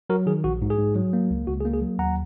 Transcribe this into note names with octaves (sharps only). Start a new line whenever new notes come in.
F#3 F#4 A#4
D#3 G#4
A#1 F#4
G#2
G#4
G#2
F#3
A#3
C#2
C#2 F#4
G#4
A#3
G#4
F#3
D#2 F#5 A#5